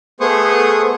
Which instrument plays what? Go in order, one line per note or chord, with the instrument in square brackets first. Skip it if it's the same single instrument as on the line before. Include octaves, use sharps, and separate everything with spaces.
[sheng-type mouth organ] A3 B3 G#4 C5 C#6 D#6